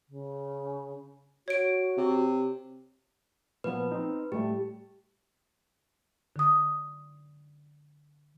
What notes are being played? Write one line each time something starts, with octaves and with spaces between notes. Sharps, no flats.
C#3
F#4 C#5 D7
C3
A#2 F3 B3 B4
C4 D#4
A2 G3 A3 G4
D3 D#6